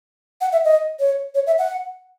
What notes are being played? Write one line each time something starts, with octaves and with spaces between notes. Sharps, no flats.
F#5
E5
D#5
C#5
C#5
E5
F#5